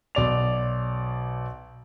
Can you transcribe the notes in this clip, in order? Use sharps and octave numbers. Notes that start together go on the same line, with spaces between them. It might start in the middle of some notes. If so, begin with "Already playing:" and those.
B1 D5 F7